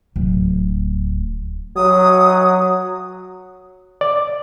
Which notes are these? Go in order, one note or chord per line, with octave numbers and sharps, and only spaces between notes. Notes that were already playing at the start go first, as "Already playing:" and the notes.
D1
F#3 D#6
D5